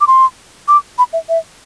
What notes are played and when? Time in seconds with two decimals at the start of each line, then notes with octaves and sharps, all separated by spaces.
0.01 D6
0.07 C6
0.68 D6
0.98 B5
1.13 E5
1.29 E5